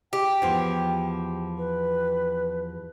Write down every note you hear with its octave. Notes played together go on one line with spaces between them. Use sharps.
G4 G5
E2 F3
B4